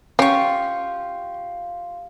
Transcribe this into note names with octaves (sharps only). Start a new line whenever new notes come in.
C#4 F4 G4 F5 C#6